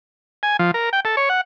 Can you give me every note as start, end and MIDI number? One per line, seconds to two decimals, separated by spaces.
0.43 0.57 80
0.59 0.71 53
0.74 0.90 70
0.93 1.00 79
1.05 1.16 69
1.17 1.29 73
1.29 1.41 78